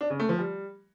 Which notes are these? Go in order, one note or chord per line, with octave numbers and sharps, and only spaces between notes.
D4
C#3
A3
F3
G3